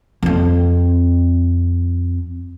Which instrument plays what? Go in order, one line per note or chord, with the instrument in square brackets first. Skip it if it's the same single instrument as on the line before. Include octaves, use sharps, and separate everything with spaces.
[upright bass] F2 C4